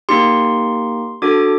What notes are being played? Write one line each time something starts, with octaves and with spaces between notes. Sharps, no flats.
A#3 D#4 G4 C6
D4 F#4 A4 D6